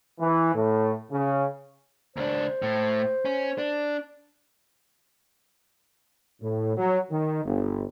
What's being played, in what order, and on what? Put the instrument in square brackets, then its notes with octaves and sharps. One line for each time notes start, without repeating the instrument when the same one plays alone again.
[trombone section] E3
A2
C#3
[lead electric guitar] C#2 D4 [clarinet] C5
[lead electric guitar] A2
C#4
D4
[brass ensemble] A2
F#3
D#3
G1